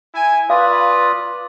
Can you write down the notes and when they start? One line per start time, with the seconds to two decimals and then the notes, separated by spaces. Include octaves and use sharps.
0.14 E4 G#5
0.50 F4 B4 D5 F5 D#6